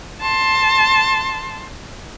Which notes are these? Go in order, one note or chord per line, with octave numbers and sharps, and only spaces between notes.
A5 C6